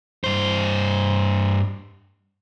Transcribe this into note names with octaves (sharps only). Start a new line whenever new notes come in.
G2 C5